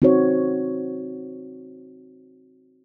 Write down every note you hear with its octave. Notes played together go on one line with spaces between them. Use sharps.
C4 D#4 F#4 C5 C#5